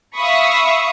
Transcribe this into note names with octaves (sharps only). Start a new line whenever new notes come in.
E5 F5 B5 C#6 D#6